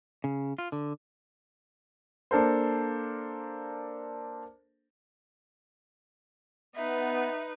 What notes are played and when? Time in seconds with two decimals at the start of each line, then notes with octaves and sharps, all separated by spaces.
0.24 C#3
0.58 F4
0.72 D3
2.31 A#3 D4 A4 A#4 C5
6.75 B3 D#4 B4 E5